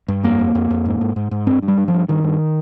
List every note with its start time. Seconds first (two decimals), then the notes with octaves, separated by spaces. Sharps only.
0.08 G2
0.23 F2 A#3
0.39 F2
0.55 F2
0.71 F2
0.86 G#2
1.01 G#2
1.16 G#2
1.31 G#2
1.47 G2 C4
1.62 G2
1.68 G3
1.78 G2
1.88 F3
1.93 G2
2.08 G2 D#3
2.24 G2